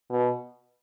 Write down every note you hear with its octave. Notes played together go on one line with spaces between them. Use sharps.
B2